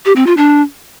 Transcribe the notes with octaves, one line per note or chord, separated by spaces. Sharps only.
G4
C4
F4
D4